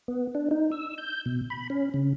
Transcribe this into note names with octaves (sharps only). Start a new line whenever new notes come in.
B3
D4
D#4
E6
G6
B2
B5
C#4
C#3